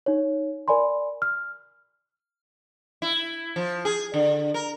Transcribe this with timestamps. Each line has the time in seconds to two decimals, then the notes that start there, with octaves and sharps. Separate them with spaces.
0.06 D#4 C#5
0.68 A#4 D5 G#5 B5 C6
1.22 F6
3.02 E4
3.56 F3
3.85 G#4
4.14 D3
4.54 A#4